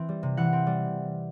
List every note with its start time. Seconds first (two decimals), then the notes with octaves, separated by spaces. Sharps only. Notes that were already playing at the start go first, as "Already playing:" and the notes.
Already playing: E3 C4
0.09 G3
0.23 C3
0.37 E3 F#5
0.53 C4
0.67 G3